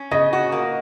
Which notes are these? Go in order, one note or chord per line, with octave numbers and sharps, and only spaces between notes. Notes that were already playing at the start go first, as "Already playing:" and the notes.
Already playing: C#4
C#3 D#5
F#4
A#3